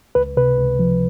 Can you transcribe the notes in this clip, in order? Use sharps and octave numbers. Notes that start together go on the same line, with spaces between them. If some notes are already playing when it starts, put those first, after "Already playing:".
C#2 B4
C3 B4
C#2
F3